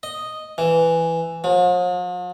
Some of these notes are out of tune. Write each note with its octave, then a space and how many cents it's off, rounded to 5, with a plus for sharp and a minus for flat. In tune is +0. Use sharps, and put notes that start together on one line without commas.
D#5 +0
E3 +5
F3 +45